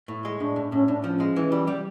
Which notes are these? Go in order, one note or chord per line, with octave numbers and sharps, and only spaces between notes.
A2
G#3
A2 D4
A2
A2 C#4
A2 D4
F3 C#4
G#3
E3
G3
G3